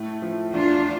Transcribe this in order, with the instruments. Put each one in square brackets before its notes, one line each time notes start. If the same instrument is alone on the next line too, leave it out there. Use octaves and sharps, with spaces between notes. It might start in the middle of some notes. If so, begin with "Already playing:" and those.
Already playing: [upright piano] A2 A3
F3
[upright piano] E2 [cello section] D4 F4